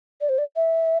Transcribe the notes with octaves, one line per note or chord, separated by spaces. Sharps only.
D5
C5
D5
E5